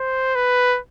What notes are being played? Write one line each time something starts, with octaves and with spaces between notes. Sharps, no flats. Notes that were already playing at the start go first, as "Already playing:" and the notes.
Already playing: C5
B4